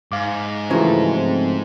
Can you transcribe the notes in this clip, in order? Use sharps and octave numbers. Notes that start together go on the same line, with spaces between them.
G#2 F5 D6
C#3 E3 F3 A3 F#4 C5 A#5
C4